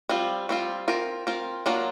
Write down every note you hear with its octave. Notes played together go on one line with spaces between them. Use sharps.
G3 C4 F4
G3 C4 F4
C4 F4 A#4
C4 F4 A#4
F#3 A#3 D4 F4